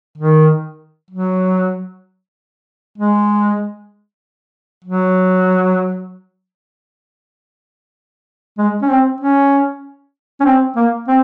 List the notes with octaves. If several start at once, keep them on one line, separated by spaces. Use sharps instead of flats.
D#3
F#3
G#3
F#3
G#3
C#4
C4
C#4
C#4
C4
A#3
C4